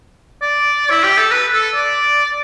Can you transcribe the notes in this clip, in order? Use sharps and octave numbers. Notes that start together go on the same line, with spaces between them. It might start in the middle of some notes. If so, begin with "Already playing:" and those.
D5
E4
G4
A4
B4
A4
D5